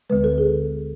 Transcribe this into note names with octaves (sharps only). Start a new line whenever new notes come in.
D2 D3 G#3 B4
A4
G#4